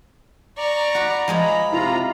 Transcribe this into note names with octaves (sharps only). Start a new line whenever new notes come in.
D5 A#5 C#6
F#4 B5
F3 G#3 D#5 B5
C3 E4 F4 A#5